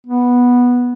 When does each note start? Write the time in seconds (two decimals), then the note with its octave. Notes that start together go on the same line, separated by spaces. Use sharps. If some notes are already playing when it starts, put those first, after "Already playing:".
0.07 B3